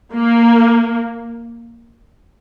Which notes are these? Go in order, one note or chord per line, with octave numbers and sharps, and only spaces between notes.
A#3